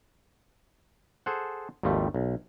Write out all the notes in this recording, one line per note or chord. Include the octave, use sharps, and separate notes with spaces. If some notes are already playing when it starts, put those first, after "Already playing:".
G#4 A4 C5 F#5
G#1 D#2 F3 G3 A3
B1